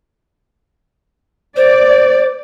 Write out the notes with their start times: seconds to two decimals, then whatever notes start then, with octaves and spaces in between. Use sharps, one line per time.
1.57 C5 D5